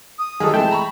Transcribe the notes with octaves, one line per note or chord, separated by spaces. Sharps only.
D#6
D#3 F#3 G3 G#4 A4
C3 E3 G#3 A3 E5 G5 A5
A#5 B5 C#6